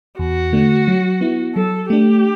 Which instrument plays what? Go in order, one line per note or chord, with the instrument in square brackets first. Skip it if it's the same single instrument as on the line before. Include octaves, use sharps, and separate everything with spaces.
[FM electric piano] E2 [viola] F#4
[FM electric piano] D3 A3 D4
F#3
B3 E4
[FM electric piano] F#3 [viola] A4
[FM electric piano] A3 D4 [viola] G4